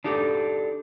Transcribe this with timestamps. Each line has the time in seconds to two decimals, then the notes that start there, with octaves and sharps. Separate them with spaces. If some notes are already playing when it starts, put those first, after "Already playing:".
0.04 D4 D#4 G4 A4